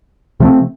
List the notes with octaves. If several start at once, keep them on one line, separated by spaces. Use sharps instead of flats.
C3 F3 A3 C4